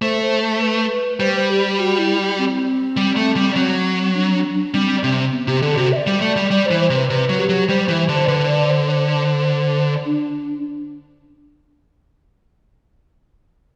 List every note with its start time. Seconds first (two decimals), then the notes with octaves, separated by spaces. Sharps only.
0.02 A3 C5
0.21 C5
0.61 B4
1.20 G3 C5
1.34 C5
1.50 G4
1.79 F#4
1.99 E4
2.38 C4
2.97 G3
3.16 A3
3.36 G3
3.56 F#3 C4
4.15 D4
4.35 D4
4.54 D4
4.74 G3 C4
5.03 C3 C4
5.32 B3
5.48 C3 G4
5.62 D3 A4
5.77 C3 F#4
5.92 E5
5.96 D5
6.07 G3
6.21 A3
6.36 G3
6.51 G3 D5
6.66 C5
6.71 E3
6.80 C5
6.90 C3
6.96 B4
7.10 C3 B4
7.29 F#3
7.39 G4
7.49 F#3
7.69 G3 C5
7.83 C5
7.88 E3
7.99 C5
8.08 D3
8.14 C5
8.28 D3 B4
8.48 D5
8.68 C5
8.87 D5
8.90 C5
10.05 D4